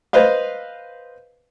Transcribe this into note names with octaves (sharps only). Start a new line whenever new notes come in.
B4 C5 D#5 F5